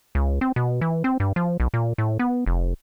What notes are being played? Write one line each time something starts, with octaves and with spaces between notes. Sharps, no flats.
C#2
C4
B2
E3
C4
G2
F3
B1
A#2
A2
B3
F1